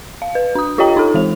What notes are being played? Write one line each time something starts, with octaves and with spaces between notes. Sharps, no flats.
F5
B4
D4 D#6
F4 G4 C#5 D#5 G5 A#5
D#4 A4
E3 G#3 F7